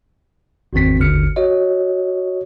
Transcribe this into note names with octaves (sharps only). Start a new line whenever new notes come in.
G#1 E2 G#2 D#3 C4 B6
G#1 D#2 D3 F6 C#7
F#4 C#5 D#5